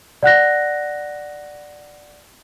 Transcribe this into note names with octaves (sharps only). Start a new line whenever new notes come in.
D5 F#5 F#6 A#6